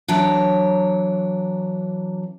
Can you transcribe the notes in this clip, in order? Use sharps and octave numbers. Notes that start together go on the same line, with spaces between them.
E3 F#3 D4 C#5